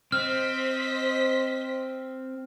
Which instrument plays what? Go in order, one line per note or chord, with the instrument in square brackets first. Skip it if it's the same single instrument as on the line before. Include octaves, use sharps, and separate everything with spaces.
[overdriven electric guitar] C4 [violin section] C5 D#5 B6 [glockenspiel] F6